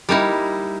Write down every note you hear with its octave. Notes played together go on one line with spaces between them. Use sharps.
G3 A#3 D#4 E4